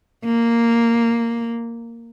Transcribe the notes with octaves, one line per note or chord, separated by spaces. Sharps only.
A#3